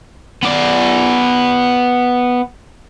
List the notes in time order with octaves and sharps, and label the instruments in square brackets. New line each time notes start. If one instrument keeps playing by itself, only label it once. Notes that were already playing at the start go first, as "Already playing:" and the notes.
[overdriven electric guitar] B3 D5